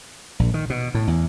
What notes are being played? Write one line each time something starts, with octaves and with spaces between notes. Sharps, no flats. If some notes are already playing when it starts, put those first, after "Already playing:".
A#1
D#3
B2
A2
E2